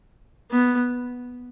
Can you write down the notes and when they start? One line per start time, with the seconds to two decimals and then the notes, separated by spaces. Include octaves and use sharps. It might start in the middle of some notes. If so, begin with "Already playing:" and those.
0.51 B3